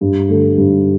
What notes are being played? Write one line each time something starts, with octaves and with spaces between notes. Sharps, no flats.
G2
D3 A3
G2